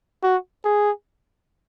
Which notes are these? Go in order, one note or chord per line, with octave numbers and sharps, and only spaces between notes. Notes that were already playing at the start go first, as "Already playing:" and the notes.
F#4
G#4